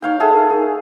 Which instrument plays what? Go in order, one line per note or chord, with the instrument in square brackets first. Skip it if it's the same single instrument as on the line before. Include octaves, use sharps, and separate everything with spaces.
[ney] D#4 [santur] C#5 F5 G5
[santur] G#4 A4 F#5 [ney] E5
[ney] A#4
[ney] D#4 [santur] G#4